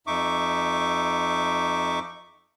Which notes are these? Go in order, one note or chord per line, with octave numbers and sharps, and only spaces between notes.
F2 D#4 E5 C#6 D6